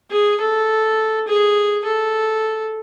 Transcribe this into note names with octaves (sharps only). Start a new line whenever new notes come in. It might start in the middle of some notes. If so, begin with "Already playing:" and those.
G#4
A4
G#4
A4